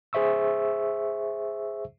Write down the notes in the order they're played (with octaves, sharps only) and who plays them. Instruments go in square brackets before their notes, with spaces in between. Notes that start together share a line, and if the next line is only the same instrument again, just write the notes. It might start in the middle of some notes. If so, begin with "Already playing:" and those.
[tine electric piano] G#4 C5 E5 C#6 E6